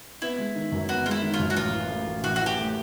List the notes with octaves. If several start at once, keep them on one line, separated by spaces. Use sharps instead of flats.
B3 E4
G#3
D#3
F#2
B3 F#4
G#3 F4
E4
D#3
F4
F#2
F#4
A1 F4
E3
A2
A1
A1 F#4
E3 F#4
G4
A2